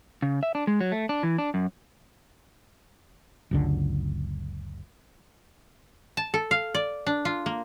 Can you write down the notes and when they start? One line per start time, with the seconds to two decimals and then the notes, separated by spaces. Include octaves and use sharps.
0.22 C#3
0.43 E5
0.55 D4
0.67 G#3
0.81 F#3
0.92 A3
1.09 D4
1.23 E3
1.38 D4
1.54 F#2
3.51 F#1 C#2 D3
6.17 A5
6.34 A4
6.51 F5
6.75 D5
7.06 D4
7.25 F4
7.46 A#3